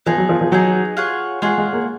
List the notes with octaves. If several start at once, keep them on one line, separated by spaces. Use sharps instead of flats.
F3 B3 D#4 G#4
F#3
F3
F3
F#3 B3 D#4 G#4
F4 G#4 C#5 F#5
G#3 F4 G#4 C#5 F#5
G#3
A#3